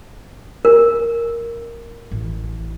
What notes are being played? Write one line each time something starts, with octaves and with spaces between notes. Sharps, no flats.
A#4
A1 E4